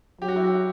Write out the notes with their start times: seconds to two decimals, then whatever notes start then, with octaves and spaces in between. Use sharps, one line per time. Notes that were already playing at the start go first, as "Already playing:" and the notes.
0.21 F#3 G4
0.28 F#4
0.36 E4
0.44 F#4